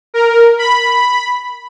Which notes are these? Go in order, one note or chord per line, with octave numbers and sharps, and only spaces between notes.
A#4
B5